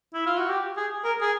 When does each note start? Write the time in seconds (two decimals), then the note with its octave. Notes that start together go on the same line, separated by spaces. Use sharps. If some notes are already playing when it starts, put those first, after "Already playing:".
0.14 E4
0.26 F4
0.38 F#4
0.49 G4
0.77 G#4
1.04 A#4
1.21 G#4